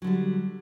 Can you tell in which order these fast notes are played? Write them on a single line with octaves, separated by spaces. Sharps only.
F#3 D3 G3